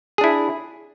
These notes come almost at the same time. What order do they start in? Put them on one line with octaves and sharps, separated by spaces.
G#4 D4 E4